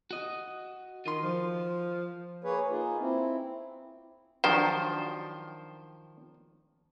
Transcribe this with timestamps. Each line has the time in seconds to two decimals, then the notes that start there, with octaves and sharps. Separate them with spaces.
0.11 F#4 D#5
1.06 D#3 F4 C6
1.23 F3
2.43 A#3 G#4 B4 C#5
2.70 A#3 D#4 F4 G#4
2.99 C4 E4
4.44 D#3 F3 F#3 D4 G4 C5